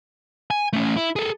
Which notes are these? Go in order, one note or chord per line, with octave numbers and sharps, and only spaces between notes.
G#5
A3 C#4
E4
G#4 A4